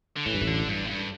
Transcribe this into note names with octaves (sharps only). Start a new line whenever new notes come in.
D3
A2 E3
G2
A1 A2
D3
G2
A2
G2